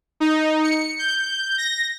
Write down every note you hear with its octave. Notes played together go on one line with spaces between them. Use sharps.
D#4
C#7
G6
A#6